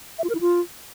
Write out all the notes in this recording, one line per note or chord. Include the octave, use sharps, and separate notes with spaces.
E5
F4
A#4
E4
F4